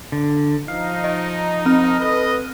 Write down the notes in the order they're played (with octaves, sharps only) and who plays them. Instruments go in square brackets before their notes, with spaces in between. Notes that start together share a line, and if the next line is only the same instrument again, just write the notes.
[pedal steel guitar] D3
[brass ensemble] F3 D#4 [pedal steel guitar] F5
[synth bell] D#5
C4 F6
[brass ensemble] A4 B4 D#5